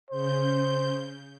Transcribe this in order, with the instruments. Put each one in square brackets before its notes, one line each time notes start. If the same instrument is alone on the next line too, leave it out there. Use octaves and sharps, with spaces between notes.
[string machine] C#3 G6 [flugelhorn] C5